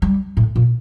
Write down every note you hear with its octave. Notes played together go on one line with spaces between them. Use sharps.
G3
A2
A#2